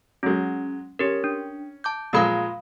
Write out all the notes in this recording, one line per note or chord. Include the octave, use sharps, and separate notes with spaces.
F#3 G#3 C#4
C#4 G4 A#4
D4
A5 D6 G6
A#2 F3 G#3 F5 B5 D#6